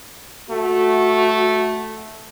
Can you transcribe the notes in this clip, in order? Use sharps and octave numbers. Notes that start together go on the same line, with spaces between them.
A3 F#4